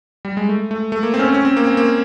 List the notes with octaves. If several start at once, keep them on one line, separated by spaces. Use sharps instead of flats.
G3
G#3
A3
A3
A3
A#3
C4
C#4
C4
C#4
C4
A#3
C4
A#3